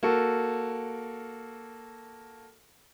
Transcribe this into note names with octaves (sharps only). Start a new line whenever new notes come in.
A#3 F#4 A4